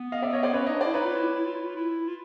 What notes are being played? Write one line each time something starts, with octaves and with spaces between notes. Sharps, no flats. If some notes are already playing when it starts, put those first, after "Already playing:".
Already playing: B3
D#5 F5
D5 E5
C#5 D#5
C5 D5
C#4 B4 C#5
D#4 C#5 D#5
D4
C5 D5
E4
D#4 B4 C#5
F4
E4
E4
F4
E4
F4
E4
F4